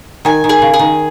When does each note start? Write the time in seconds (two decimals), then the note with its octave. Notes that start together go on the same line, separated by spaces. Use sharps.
0.25 D#3 G#5
0.44 D#3
0.49 G#4
0.62 C#3
0.74 G#4
0.79 D#3